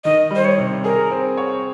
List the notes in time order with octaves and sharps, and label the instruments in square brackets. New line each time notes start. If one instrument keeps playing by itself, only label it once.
[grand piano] D#3 [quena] D#5
[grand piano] G3
[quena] C5
C#5
[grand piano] C3
[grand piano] G#4 [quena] A#4
[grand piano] C4
C#5